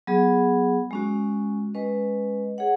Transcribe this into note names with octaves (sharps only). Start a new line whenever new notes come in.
F#3 B3 G#4
G#3 C#4 F#4
G#3 C#4 B4 D#5
G#4 C#5 F#5